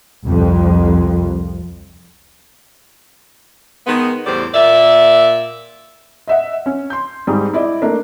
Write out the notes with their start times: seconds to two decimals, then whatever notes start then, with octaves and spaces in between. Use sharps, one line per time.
0.22 C2 F2
3.87 D#3 G#3 B3
4.26 E2 A2 G3 C5 D5
4.55 A#2 A#3 D5 E5
6.27 D#5 E5 F#5
6.66 C#4
6.90 C6 G6
7.27 G#2 G3 G#4
7.53 E4 D5 D#5
7.82 A3 A#3 D4